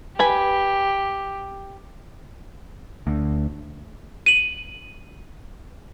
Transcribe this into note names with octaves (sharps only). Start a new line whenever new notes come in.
G4 B4 G#5 B5
D2
D#7 F#7